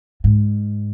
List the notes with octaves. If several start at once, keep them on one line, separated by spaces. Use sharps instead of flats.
G#2